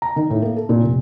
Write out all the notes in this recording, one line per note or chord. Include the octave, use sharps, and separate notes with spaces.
A#5
D#3
A2
A#3
A4
A#2
F1